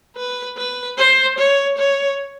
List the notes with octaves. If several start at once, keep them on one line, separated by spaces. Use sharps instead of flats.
B4
B4
C5
C#5
C#5